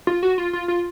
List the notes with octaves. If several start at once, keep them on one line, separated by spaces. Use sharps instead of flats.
F4
F#4
F4
F4
F4